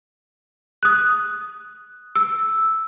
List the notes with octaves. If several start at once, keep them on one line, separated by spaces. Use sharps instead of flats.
D#6 F#6
E6